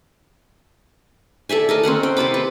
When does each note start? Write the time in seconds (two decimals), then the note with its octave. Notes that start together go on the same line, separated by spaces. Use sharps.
1.49 A4 D5 E5 G#5
1.69 A4 A#4 D#5
1.83 C4 C#4 A#4 F#5
2.03 G5
2.17 C3 A5 B5 D6
2.34 B4